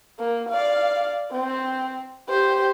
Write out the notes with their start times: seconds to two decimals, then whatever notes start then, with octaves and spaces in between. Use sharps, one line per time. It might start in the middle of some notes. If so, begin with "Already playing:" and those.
0.19 A#3
0.49 D5 F5
1.31 C4
2.29 G4 C5